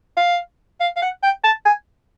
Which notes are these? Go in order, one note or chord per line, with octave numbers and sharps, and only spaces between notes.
F5
F5
F5
F#5
G5
A5
G#5